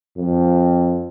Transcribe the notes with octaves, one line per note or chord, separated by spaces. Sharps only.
F2